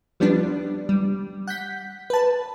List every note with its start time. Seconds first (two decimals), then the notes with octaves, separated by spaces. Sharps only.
0.20 F3 G3 B3 D4
0.89 G3
1.47 F#5 G6 B6
2.10 B4 A5